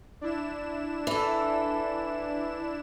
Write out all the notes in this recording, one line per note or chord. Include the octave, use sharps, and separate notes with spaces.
D4 E4 E7
E3 A4